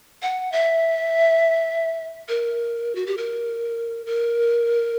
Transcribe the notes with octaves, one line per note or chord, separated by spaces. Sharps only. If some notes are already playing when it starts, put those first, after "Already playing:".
F#5
E5
A#4
F#4
G4
A#4
A#4